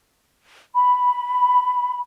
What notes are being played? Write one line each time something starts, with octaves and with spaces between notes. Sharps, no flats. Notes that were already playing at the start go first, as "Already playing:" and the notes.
B5